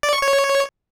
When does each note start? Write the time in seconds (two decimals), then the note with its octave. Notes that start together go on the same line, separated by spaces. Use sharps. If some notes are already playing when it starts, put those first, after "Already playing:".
0.03 D5
0.13 C#6
0.22 C#5